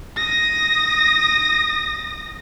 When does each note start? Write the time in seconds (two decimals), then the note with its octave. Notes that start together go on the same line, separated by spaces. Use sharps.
0.17 D#6 A#6